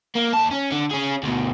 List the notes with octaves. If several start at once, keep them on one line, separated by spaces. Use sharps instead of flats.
A#3
D#2 A5
C#4
D3
C#4 G#4
D2 B2